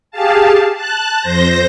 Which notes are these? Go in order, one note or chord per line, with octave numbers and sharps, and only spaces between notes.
G4 G#4 F5 A5
A5 F#6
F2 C5 G6 A#6